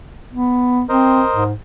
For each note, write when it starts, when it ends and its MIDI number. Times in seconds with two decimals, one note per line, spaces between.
0.33 0.83 59
0.89 1.22 60
0.89 1.44 70
0.89 1.44 72
0.89 1.44 75
1.34 1.53 44